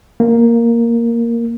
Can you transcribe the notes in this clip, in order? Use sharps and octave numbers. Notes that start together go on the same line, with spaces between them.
A#3